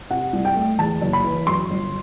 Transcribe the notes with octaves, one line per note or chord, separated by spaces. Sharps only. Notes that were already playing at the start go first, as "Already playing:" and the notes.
C3 F#5
C2
G5
A3
E2 A5
F#1
B5
E3
F#2 C6
G1